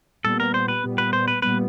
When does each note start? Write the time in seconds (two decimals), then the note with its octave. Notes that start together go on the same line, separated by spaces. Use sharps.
0.24 A#2 G3 B3 A4
0.40 A#4
0.54 C5
0.68 B4
0.83 A#2 G3 B3
0.98 B4
1.13 C5
1.28 B4
1.42 A#2 G3 B3 B4